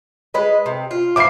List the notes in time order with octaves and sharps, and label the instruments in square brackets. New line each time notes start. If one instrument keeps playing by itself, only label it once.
[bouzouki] G#3 B4 D#5
C3
F4
[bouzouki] E3 F3 E4 [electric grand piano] D6 C7